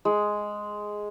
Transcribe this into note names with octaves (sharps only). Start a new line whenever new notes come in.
G#3